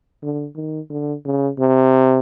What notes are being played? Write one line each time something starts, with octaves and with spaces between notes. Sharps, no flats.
D3
D#3
D3
C#3
C3